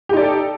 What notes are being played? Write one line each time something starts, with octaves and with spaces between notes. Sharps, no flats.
D#4 G4 A4 D5